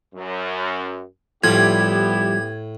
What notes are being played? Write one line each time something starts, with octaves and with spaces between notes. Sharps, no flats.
F#2
A2 F3 G3 B3 E4 G4 G#6